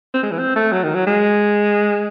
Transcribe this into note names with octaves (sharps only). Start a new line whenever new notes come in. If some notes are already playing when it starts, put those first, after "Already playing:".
C4
G#3
E3
C4
A3
F#3
D#3
F#3
G#3